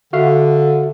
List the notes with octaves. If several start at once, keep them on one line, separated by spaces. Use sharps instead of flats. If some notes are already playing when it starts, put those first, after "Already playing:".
D3 F#4 E5 F5